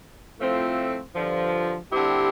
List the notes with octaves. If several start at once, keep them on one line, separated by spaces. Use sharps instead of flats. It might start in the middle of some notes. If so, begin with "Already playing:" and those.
A2 F3 A3 C4 F4
G2 D3 F3
D3 G3 C4 E4 G4